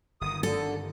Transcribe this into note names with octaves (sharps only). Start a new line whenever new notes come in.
G1 D#3 D#6
D3 A4